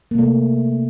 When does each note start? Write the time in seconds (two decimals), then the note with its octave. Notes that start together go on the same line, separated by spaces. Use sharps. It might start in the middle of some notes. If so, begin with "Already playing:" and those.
0.11 A#3
0.15 C3
0.18 A3